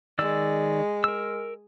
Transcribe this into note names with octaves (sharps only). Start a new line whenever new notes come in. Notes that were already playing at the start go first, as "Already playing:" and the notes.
D#3 G#3 D5 E6
A#4 E6